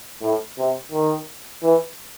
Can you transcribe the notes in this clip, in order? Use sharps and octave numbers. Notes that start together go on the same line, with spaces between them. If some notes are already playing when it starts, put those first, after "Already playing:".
A2
C3
D#3
E3